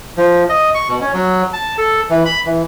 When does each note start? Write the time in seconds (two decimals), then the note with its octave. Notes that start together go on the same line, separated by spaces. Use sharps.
0.17 F3
0.49 D#5
0.74 C#6
0.88 B2
1.01 C#4
1.14 F#3
1.53 A5
1.78 A4
2.10 E3
2.25 B5
2.46 E3